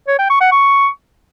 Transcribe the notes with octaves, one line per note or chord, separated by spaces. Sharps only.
C#5
G5
C#6
F#5
C#6